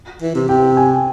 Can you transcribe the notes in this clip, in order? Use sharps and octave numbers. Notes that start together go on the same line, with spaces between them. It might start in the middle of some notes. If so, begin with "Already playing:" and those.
E3
C3
C3 G5
G#5